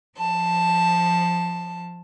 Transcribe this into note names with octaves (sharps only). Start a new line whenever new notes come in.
F3 A5